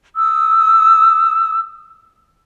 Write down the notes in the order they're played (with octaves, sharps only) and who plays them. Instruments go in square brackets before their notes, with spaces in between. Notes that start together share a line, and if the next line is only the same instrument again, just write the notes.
[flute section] D#6 E6